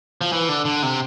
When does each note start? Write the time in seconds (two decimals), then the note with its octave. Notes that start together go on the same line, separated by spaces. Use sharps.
0.21 F3
0.33 E3
0.49 D3
0.65 D3
0.83 C3